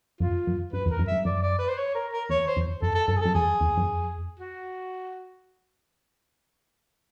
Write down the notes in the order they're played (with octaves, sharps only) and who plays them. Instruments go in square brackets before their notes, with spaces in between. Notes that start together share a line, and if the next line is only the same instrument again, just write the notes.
[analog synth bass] F#2 [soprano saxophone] F4
[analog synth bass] F#2
[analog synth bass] G2 [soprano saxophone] B4
[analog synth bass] F2
[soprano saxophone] A#4
[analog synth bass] F#2
[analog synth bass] G2 [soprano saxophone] E5
[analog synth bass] F#2 [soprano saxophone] D5
[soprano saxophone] D5
B4
C5
C#5
A#4
A#4
[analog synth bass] E2 [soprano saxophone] C#5
[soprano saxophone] C5
[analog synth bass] F2
[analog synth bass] F#2 [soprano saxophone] A4
[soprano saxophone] A4
[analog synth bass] G2 [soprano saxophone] A4
[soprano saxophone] G#4
[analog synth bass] F#2 [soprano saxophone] A4
[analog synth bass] F2 [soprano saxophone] G#4
[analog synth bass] E2
F#2
F2
[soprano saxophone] F#4